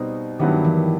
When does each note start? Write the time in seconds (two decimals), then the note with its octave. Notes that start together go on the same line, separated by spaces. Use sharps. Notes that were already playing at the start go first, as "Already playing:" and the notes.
Already playing: B2 G3 C4 D#4
0.39 G2 D#3 F#3 B3 E4 G4
0.64 E3